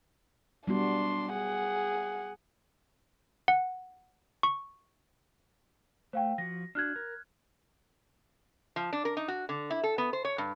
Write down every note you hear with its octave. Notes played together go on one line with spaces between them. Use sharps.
G3 B3 D4 F#4 C6
G#4 F#5
F#5
C#6
A3 C5 F5 G5
F3 F#4 A#6
D4 F#4 F6 F#6 G#6
A#4
F3
D4
A#4
D#4
F#4
D3
E4
A4
B3
C5
C#5
G2